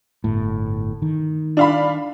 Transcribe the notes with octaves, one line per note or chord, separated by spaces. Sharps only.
G1 A2
D#3
D4 F5 B5